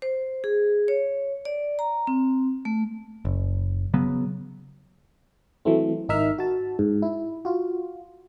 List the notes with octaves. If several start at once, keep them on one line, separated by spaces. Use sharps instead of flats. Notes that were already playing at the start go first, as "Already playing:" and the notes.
C5
G#4
C#5
D5
A#5
C4
A3
F#1
C#3 F#3 B3
E3 F#3 A3 C4
G#1 D#4 A#4 E5 F6
F#4 A5
G#2
E4
F4 F#4